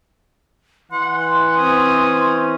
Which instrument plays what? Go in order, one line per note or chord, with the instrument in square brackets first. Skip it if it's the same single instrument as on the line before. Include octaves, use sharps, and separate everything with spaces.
[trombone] E3 [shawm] F#5 [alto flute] C6
[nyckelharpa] C4 D#6 [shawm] C#4